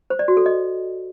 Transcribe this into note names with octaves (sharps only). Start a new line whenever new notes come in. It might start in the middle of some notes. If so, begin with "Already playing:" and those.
C5
D5
F#4
A4
D#5